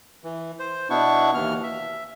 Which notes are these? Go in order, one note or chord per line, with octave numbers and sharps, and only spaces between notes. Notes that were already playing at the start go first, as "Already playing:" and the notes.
E3
C5
B2 B3 D4 E4 C#6
D#2 E3 F6
E5